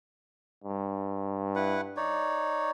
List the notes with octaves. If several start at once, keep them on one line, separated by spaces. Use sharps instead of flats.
G2
E4 B4 F#5
D#4 C#5 D5